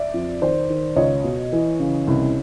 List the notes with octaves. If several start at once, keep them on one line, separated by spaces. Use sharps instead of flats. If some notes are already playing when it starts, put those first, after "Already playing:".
Already playing: D5 E5
F2
D#3 C5 D5
D#3
C#2 C#5 D#5
B2
E3
C#3
C2